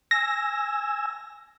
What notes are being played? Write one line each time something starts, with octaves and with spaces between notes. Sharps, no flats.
G#5 E6 A#6